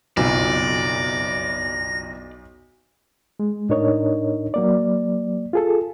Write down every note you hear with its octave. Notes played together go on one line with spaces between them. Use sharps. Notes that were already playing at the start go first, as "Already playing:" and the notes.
F#1 B1 F2 D5 A#6
G#3
A2 D4 D#4 A#4 C#5 D#5
F#3 A#3 D5
F4 G#4 A4